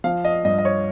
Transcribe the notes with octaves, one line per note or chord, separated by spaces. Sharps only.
F3 F5
D#5
G2 D#5
D#5
C#5